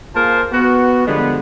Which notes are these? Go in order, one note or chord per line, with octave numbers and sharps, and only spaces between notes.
A#3 F4 G#4 A#4 C5 A5
B3 F#4
D3 F3 G3 G#3 B3